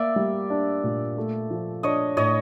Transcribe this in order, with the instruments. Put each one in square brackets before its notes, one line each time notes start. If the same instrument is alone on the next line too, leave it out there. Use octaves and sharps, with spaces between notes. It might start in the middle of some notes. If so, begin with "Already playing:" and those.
Already playing: [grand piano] A#3 [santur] D5 E5
[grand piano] G3
D4
A#2
A3
F3
[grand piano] D4 [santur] C#5 D#5
[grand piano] A2 [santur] C#5 D#5